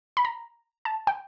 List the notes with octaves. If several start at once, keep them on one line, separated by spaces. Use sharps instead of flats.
B5
A#5
A5
G5